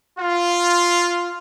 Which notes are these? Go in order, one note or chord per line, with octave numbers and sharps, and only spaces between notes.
F4